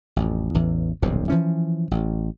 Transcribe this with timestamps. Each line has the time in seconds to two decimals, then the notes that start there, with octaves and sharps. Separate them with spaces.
0.16 A1 F2
0.54 A1 E2 E3
1.02 D#1 B1 F2 C3
1.29 E3 F3 C#4
1.91 A1